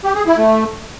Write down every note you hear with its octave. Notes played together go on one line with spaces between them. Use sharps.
G4
G#4
E4
A3